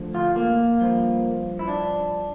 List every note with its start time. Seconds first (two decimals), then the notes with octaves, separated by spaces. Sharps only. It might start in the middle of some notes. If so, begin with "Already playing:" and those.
Already playing: D2 D3 F3
0.15 F4
0.36 A#3
0.80 G2 F3
1.59 E4
1.67 D4